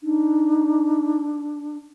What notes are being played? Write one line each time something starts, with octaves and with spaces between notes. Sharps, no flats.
D4 D#4